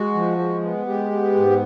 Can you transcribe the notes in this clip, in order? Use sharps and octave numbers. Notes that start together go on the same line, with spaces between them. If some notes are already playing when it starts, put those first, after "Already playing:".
Already playing: G#3 F#4
F3
G#3
B3
G#3 G4
B3
G#2